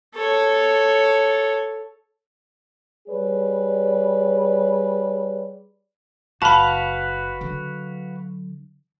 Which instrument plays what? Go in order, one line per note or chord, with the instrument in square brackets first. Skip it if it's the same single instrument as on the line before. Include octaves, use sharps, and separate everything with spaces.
[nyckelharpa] A4 C#5
[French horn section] G3 G#4 B4 C#5 D5
[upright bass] F#1 [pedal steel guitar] F#4 B4 F5 [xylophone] A5 B5
[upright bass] D3 F#3